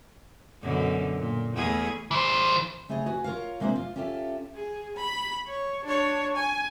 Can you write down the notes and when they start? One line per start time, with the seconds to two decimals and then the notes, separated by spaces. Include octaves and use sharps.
0.62 F#2 B2 D3
1.19 A#2
1.54 E2 A3 G#4
2.11 E3 C5
2.89 C#3 A3 G#4 C#5 D#5
3.06 F#4 B4 G#5
3.24 F4 A#4 C#5 F5
3.60 C3 G#3 A#3 D4 C5 E5
3.76 F4
3.96 C#4 F4 G4 A4 E5
4.55 G#4
4.96 B5
5.47 C#5
5.84 D4 C#5
6.36 G#5